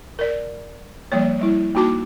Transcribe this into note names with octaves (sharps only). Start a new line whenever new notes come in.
A#4 D5
F3 G3 A#3 C#5
G3 E4
A#3 D#4 F#4 A5 D6